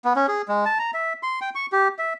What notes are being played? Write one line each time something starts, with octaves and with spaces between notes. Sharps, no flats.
B3
C#4
G#4
G#3
A5
A#5
E5
C6
G5
C#6
G4
E5